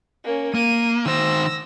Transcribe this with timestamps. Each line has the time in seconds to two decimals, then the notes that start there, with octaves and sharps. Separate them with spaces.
0.24 A#3 C#4
0.54 A#3 D#7
1.06 D#3 C5 E6 A#6